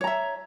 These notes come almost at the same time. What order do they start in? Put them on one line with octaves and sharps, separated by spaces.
C#5 A#5 E5